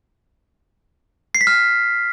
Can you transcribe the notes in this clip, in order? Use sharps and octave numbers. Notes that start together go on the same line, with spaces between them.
C7
B6
F6